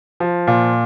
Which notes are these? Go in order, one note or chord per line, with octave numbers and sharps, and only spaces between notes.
F3
A#2